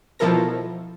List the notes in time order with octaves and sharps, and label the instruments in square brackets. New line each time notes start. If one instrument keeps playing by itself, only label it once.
[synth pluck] B2 F3 E4 A4 A#4 A#6